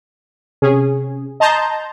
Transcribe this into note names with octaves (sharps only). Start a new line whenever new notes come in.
C3 C#4 G#4
D#5 A5 A#5 C6 G6